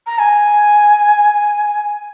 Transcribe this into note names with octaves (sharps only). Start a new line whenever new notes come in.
A#5
G#5